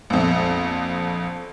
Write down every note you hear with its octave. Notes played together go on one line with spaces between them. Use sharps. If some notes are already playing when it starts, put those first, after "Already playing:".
A#1 F2